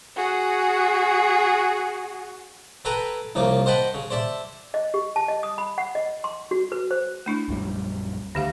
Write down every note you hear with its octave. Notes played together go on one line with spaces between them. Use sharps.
F#4 G#4
A4 B4 G5 G#5 A#5 B5
C2 C#3 F3 A#3 D6
C5 D#5 F#5 G5 A5 B5
C#3
C5 D5 E5 A5
D#5
G4
A5
D#5
D#6
B5
F#5
D#5
C6
F#4
B4
C5
A3 D4 E4
A#1 F#2 G3
D2 D#3 G4 F5